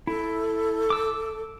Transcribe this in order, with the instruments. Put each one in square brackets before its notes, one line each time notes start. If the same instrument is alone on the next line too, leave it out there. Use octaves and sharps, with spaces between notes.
[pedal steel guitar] E4 [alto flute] A4
[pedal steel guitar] D6 E6